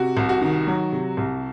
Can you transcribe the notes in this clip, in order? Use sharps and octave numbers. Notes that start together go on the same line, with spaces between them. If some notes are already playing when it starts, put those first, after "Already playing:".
Already playing: C3 F#4
C2
F#4
D#3
F#3
C3
C2